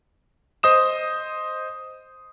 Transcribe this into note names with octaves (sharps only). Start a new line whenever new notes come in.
C5 D#5 D#6 E7